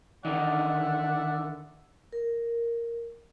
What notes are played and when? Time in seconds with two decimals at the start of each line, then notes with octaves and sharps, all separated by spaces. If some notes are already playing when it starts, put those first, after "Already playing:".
0.25 D3 D#3 D5 E5 F#5
2.13 A#4